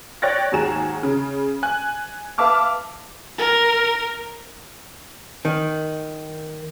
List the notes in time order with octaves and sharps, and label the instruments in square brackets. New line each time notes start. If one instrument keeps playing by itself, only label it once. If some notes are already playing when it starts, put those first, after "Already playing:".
[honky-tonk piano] C#5 D5 G5 F#6 A6 A#6
D#2 G#2 F#4 G#4 A#5 E7
C#3
G#5 F#6
B4 E5 F5 A5 D6 F6
[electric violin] A#4
[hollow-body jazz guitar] D#3